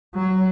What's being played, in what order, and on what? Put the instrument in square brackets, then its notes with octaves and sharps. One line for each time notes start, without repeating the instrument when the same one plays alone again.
[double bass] F#3